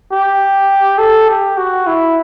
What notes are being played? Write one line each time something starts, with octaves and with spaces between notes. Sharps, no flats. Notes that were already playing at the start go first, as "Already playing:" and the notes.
G4
A4
G4
F#4
E4